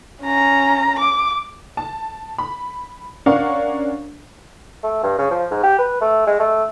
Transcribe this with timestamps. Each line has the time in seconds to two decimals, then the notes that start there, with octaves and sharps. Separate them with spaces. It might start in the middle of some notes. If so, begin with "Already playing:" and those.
0.22 C#4 A#5
0.99 D6
1.77 A5
2.38 B5
3.26 C#4 D4 A#4 F5 F#5 C#6
4.83 A3
5.03 G2
5.18 C#3
5.31 F3
5.51 G#2
5.63 G4
5.79 B4
6.01 A3
6.27 G#3
6.40 A3